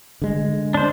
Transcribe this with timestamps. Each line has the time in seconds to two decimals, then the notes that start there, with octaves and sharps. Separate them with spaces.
0.22 D3 G#3
0.74 D4 C5